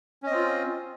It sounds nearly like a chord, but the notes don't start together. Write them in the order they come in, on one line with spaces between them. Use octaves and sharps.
C#4 D#5 C4 F4